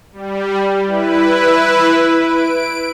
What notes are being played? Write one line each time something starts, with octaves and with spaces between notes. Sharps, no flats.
G3
E4 B4
D7